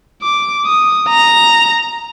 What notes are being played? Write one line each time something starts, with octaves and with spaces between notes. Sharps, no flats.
D6
D#6
A#5